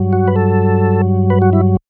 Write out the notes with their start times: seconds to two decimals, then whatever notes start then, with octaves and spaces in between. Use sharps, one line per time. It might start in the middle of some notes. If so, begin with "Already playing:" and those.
Already playing: G2 F#3
0.13 F#4
0.28 B4
0.36 A4
1.30 B4
1.42 F#4
1.53 E4